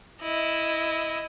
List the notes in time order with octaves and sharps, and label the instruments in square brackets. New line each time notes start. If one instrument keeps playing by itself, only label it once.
[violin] E4 D#5